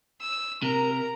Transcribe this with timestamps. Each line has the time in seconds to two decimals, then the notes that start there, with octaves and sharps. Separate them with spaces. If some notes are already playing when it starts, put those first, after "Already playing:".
0.21 E6
0.63 C3 A#4 A#5